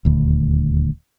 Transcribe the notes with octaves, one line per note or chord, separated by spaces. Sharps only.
D#1 D2